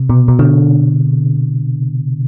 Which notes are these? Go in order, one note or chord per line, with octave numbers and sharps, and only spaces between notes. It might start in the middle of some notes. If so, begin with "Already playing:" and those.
Already playing: C3
B2
B2
D3